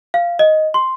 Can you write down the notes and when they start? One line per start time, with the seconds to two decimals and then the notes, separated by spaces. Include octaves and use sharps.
0.14 F5
0.39 D#5
0.74 C6